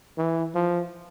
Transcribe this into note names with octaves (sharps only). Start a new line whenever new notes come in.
E3
F3